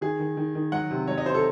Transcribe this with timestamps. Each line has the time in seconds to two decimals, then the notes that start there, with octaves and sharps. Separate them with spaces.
0.01 D#3 G#4
0.19 D#3
0.37 D#3
0.55 D#3
0.72 F#3 F#5
0.91 C3
1.08 F#3 C#5
1.18 D#5
1.26 C3 C5
1.35 A4